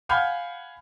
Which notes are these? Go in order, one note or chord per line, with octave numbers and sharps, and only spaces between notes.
F5 F#5 G#5 B5 F6 G6